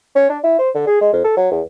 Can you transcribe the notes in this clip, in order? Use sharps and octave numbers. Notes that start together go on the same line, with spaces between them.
C#4
D4
E4
C5
D3
G#4
G#3
F2
A4
F#3
E2